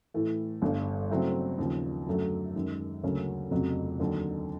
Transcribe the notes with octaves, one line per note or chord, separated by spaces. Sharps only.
A2 E3 A3
G1 G2 D3
C#3 F#3 A3 C4 E4
D#2 C#3 F3
F#2 D3 F#3 A3
F#2 D#3 G#3
D2 C#3 F#3 A#3 C#4
F1 F2 C#3 F#3
D#2 D3 F#3